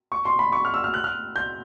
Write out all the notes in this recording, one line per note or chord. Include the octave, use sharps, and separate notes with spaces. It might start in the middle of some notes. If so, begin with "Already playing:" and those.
C#6
C6
B5
C#6
F6
E6
F6
F#6
F6
G6